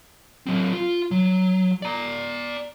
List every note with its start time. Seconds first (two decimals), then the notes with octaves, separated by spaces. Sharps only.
0.47 F#3 C4
0.73 F4
1.11 F#3
1.82 D5 A#5